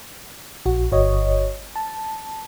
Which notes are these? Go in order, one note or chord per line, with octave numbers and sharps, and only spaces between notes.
A#1 F#4
G1 F#4 C#5 D#5
A5